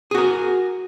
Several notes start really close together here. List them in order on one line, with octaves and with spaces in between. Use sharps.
G#4 F#4 A#4